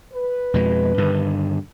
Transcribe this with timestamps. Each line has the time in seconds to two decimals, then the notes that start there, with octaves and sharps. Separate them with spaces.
0.13 B4
0.54 F2 B2 G#3
0.98 G2 D3 D#3